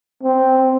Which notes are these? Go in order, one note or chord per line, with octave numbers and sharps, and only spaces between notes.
C4